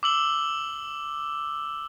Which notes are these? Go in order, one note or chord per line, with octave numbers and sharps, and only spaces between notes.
D6 E6 F#7 G7